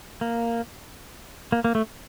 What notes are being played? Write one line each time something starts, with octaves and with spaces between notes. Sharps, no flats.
A#3
A#3
A#3
A3